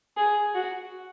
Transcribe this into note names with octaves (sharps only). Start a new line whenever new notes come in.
G#4
F#4